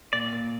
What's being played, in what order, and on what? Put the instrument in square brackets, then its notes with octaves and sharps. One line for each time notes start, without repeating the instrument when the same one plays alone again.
[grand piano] A#2 [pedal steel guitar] D5
[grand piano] A#2